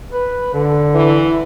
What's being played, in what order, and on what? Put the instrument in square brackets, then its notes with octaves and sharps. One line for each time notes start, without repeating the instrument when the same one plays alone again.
[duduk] B4
D3
[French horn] E3